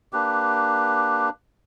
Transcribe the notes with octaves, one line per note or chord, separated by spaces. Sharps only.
A#3 D4 G4 B4